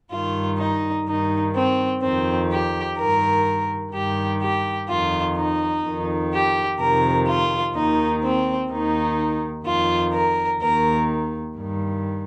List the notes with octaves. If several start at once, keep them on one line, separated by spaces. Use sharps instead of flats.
G2 D#3 F4
D#4
G2 D#3 D#4
C4
F2 D#3 C4
G4
G2 D#3 A#4
G2 D#3 G4
G4
F2 D#3 F4
D#4
F2 D#3
G4
F2 C3 D#3 A#4
F4
D#2 D#3 D#4
C4
D#2 D#3 D#4
F2 D#3 F4
A#4
D#2 D#3 A#4
G2 D#3